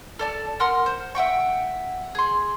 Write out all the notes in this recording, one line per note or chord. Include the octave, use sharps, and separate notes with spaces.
A4 D5 A5
A#4 F#5 C6 F6
C5
E5 F#5 G5 C#6
G#4 C6